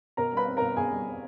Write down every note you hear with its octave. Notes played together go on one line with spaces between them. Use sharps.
B2 A#4 A#5
G3 B4 B5
C4
B2 A#4 A#5
B2 G#4 G#5
G3
C4